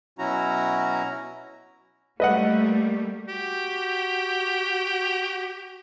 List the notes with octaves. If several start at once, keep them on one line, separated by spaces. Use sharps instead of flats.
B2 F#3 C#4 E4 F#4 A#5
G3 A3 A#3 B4 D#5 F#5
F#4 G4